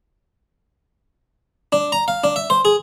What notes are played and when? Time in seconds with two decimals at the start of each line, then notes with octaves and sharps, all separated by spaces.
1.72 D4
1.92 A#5
2.08 F5
2.24 D4
2.36 E5
2.50 C5
2.65 G#4